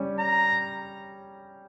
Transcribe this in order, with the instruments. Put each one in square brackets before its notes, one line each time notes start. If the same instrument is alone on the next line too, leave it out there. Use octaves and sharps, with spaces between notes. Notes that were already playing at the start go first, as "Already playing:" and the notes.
Already playing: [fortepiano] G3 C#4
[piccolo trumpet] A#5